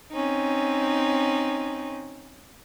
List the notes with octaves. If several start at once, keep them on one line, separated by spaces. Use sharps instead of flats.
C4 C#4 D#4